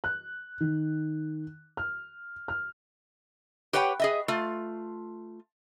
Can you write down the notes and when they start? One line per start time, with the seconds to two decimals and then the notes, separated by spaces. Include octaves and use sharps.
0.04 F#6
0.60 D#3
1.77 F6
2.48 F6
3.73 G4 B4 C#5 F#5 G5
4.00 G#4 D#5 E5
4.28 A3 F4